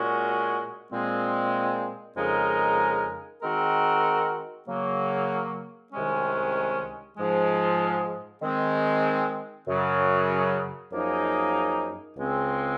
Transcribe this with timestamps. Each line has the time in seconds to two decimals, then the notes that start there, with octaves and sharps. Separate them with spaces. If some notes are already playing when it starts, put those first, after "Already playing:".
Already playing: A#2 G#3 C#4 F#4
0.92 A#2 G#3 C4
2.16 F2 C#3 G#3 D#4 A#4
3.41 D#3 G#3 C4 F#4 A#4
4.66 C#3 F#3 A#3
5.91 C2 C3 D#3 G#3 C#4
7.16 G#2 F3 G#3
8.42 D#3 G#3 C4
9.67 F#2 C#3 F#3
10.91 F#2 F3 A#3 D#4 G#4
12.16 C#2 C#3 G#3 C4